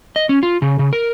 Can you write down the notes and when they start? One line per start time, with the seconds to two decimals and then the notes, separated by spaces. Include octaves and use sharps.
0.16 D#5
0.29 C#4
0.43 F4
0.62 C#3
0.79 C#3
0.93 A#4